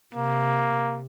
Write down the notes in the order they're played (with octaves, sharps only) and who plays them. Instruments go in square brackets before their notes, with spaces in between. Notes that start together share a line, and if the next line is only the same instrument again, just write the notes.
[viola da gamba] C3 [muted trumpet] A#3